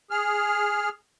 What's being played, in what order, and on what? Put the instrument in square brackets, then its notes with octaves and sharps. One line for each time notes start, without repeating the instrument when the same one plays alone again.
[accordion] G#4 F6